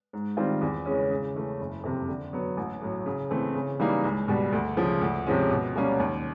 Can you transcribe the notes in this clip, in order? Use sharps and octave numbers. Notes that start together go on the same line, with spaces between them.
G#2
D#3 G3 C4 F4
E2
C#3 E3 G#3 C#4
C#3
E3 A3 C#4
F#1
F2 C3
D3
F#3 B3
A1
A2 F#3
C#3
E3 A3 C4
C#3
E3 G3 A#3 D#4
C#2
B2 G3
D2
C#3 F3
D2
C3 F3 G#3 C#4
B2
G3 A#3 C#4
D#2